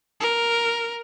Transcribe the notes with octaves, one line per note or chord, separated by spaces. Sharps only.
A#4